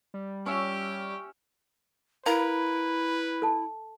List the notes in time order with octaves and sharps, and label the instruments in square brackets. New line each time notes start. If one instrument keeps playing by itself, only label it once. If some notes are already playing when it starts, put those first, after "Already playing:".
[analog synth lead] G3
[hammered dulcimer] C#4 C#5 E5 [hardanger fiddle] G4
[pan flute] E4 [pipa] A#4 [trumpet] B4 [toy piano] F5
[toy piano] A4 A5